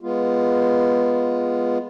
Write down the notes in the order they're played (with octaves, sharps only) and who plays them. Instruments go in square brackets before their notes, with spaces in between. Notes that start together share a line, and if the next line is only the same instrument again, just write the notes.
[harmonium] G#3 B3 F4